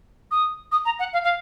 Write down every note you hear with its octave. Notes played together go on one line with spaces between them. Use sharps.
D#6
D#6
A#5
F#5
F5
F5